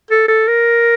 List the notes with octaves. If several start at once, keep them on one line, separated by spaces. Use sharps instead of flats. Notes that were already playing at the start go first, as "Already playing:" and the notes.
A4
A4
A#4